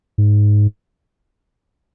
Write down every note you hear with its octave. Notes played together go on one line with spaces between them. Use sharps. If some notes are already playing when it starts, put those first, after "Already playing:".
G#2